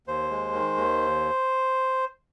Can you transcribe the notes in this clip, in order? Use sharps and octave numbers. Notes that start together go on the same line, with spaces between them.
D#2 C5
G#3
D#3
D#2